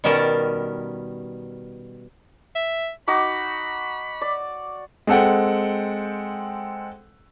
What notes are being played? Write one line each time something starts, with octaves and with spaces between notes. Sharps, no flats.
B2 D#3 G3 C#4 A#4 A5
E5
D#4 F#4 B5 D6
D5
G#3 C4 A4 F#5 G5